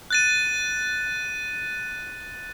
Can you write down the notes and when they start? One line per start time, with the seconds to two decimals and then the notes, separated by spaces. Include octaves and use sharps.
0.10 F#6 A6 D#7